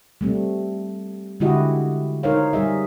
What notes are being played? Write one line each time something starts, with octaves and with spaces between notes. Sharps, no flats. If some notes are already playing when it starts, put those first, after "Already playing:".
G3 A3 C4
D3 G#3 E4 F#4 G4 D#5
D#4 A#4 C5 C#5 F5
G3 G#4 D#5 E5